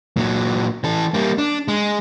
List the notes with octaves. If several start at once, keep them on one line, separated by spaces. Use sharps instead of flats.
A#2 F#3
E3 A4
G3 A#3
D4
G#3